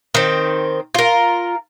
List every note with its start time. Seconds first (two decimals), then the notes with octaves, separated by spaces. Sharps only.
0.14 D#3 C4
0.95 F4 A#4